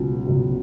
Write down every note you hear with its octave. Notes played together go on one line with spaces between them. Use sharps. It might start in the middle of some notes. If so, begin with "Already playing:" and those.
Already playing: C#2 B2 F#3
C#2 B2 F#3